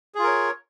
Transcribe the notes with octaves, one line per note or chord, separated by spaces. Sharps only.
F4 G#4 A#4 C#5